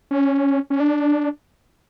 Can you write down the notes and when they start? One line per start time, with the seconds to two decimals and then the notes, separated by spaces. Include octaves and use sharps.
0.11 C#4
0.70 C#4
0.80 D4